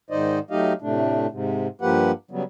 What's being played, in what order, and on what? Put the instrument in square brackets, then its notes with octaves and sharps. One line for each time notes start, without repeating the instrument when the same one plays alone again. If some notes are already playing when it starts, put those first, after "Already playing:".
[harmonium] G#2 D#3 D#4 C5 D5 D#5
F#3 A3 D#4 G4 D#5 F5
A2 C3 A3 D4
G#2 C3
G2 F3 A#3 G4 B4 F#5
C#3 F#3 G3 B3